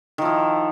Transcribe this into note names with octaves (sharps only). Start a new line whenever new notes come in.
D#3 F3 E4